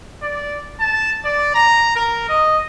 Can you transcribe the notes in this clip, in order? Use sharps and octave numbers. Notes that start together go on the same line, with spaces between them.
D5
A5
D5
A#5
A#4
D#5